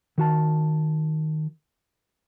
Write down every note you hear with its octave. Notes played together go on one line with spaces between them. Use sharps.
D#3 F#4 A5